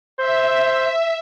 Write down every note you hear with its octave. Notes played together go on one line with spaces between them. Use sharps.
C5 E5